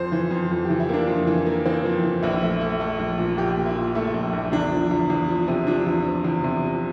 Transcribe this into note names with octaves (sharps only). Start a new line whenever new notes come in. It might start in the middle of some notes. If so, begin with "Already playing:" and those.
Already playing: F2 C5
E3
F2
F2
G4
E3
E4
A#3 D4
F2
E3
A#3
E3 C4
F2
E3
A#1 E4
A3
A3
A3
A#1
A#2
A#1 G4
A#2
E4
A#2
A3 E4
A#1
A#1
E2 D4
F3
E2
E2
F3
C3
F3 D4
E2
F3
E2
C3
F3